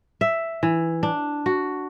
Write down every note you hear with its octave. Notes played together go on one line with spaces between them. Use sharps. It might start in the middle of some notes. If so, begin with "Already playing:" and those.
E5
E3
D4
F#4